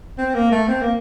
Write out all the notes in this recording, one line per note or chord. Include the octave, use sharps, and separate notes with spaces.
C4
A#3
A3
C4
A#3